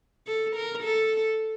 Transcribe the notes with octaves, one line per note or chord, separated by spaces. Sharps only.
A4
A#4
A4